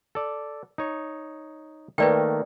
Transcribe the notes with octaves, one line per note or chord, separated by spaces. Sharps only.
A4 D5
D#4 C#5
D#3 A3 A#3 B4 D5 G5